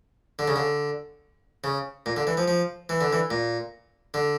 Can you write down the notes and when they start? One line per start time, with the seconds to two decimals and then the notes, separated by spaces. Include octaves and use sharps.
0.39 D3
0.48 C#3
0.56 D3
1.64 C#3
2.06 A#2
2.16 D3
2.27 E3
2.37 F3
2.48 F3
2.89 E3
3.01 D3
3.13 E3
3.31 A#2
4.14 D3